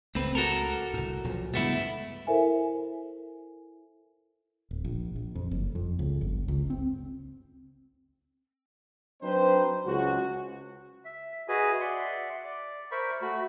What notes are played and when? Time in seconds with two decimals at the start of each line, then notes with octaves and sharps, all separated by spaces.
0.15 C#2 A3 C4 B4
0.35 F#4 A4 A#4
0.94 C2 A2
1.24 B1 A#2 F3
1.54 G2 C#3 G#3 A3 B3 E4
2.27 E4 A4 A#4 C5 E5 G#5
4.71 D1
4.85 A#1
5.16 A#1
5.35 F2
5.51 F#1
5.75 F2
5.99 C#2
6.21 G1
6.48 C#2
6.70 C4
9.22 F#3 C4 D4 D#4 B4 C5
9.85 C#2 F#4
11.05 E5
11.48 F#4 G#4 B4 D#5 E5 G#5
11.81 D5 E5 F#5 C6
12.44 D5
12.91 A#4 C5 E5 B5 C#6
13.22 A3 F#4 B5